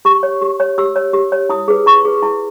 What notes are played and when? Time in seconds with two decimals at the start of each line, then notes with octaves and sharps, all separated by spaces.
0.05 G4 C#6
0.23 C#5
0.41 G4
0.60 C#5
0.78 G4 E6
0.96 C#5
1.13 G4
1.32 C#5
1.50 E4 D#6
1.68 G#4 B4
1.86 E4 C#6
2.05 G#4 B4
2.22 E4